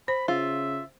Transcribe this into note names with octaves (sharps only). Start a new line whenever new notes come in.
C5 B5
C#3 F4 E5